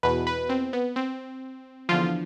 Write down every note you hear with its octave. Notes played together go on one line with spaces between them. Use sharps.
E2 B2 B4
B4
C4
B3
C4
E2 D3 F3 F4